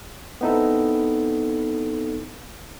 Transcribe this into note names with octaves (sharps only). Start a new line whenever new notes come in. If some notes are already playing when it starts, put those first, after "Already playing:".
B3 C4 D#4 E4 A4